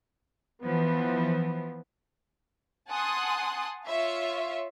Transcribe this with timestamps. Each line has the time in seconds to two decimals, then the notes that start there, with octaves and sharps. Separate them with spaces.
0.63 E3 F3 B3
2.89 F#5 G#5 A5 C6 D#6 F#6
3.86 F4 C#5 E5 F5